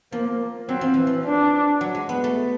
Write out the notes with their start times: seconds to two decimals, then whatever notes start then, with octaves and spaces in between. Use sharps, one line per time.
0.12 F3 A#3
0.69 F#3 C4
0.81 F3
0.94 E3
1.07 F3
1.25 D4
1.81 F#3
1.95 G#3
2.09 B3
2.24 A3